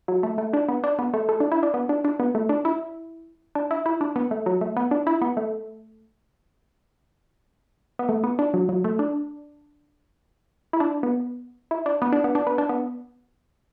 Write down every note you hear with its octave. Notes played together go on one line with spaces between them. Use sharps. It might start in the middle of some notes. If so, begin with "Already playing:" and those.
F#3
A3
A3
D4
B3
D4
B3
A3
A3
D4
E4
D4
B3
D4
D4
B3
A3
D4
E4
D4
E4
E4
D4
B3
A3
F#3
A3
B3
D4
E4
B3
A3
B3
A3
B3
D4
F#3
F#3
A3
D4
E4
D4
B3
E4
D4
B3
D4
B3
D4
B3
D4
B3